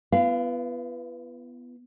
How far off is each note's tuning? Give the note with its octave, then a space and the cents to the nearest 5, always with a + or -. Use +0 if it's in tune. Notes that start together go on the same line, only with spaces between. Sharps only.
B3 +0 E4 +45 F5 -20